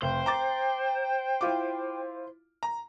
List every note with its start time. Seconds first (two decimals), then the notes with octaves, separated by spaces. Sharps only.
0.02 F1 C5 G5
0.26 A#5 D6 A6
1.41 E4 F4 D6
2.63 A#5